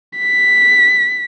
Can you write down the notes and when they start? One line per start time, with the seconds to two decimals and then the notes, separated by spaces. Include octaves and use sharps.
0.18 B6